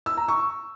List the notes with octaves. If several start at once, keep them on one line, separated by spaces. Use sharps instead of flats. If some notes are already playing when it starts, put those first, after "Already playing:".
E6
A#5
C#6